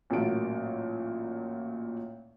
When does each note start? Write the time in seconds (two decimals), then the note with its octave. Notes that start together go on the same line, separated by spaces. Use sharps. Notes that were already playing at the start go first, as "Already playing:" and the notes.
0.10 A1 A#2 F#3 A#3 A5 D7